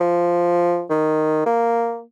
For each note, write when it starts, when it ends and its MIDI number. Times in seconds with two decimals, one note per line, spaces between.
0.01 0.84 53
0.90 1.42 51
1.46 2.02 58